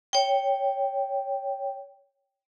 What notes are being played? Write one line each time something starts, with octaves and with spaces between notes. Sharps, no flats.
C#5 G5